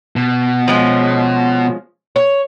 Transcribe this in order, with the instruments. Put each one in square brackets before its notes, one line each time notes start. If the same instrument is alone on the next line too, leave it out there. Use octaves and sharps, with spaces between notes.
[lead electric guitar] B2
[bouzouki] F3 G#3 C#4
C#5